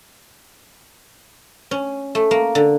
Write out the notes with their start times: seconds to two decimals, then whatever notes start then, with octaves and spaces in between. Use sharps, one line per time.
1.71 C#4
2.15 A3
2.31 A#3
2.55 D3